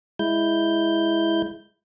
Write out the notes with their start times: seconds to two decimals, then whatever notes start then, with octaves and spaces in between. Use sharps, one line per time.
0.19 G#3 E4 G6